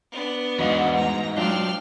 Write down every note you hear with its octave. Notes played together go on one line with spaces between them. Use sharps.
B3 D4
E2 G#2 F#4 D#5 F5 F#5
A#5
F#3 D4 F4 G5 F6